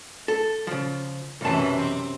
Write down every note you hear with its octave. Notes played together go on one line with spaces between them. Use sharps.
A4
C#3 F3
B1 F#2 C3 E3 A5
C4